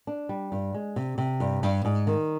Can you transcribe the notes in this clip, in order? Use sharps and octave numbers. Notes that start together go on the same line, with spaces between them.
D4
G3
G2
G#3
C3
C3
G2
G2
G#2
D#3